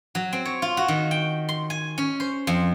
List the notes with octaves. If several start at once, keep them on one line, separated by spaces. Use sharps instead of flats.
F#3
C4
C#5
F4
F#4
D#3
G5
C6
G#5
C#4
C5
F2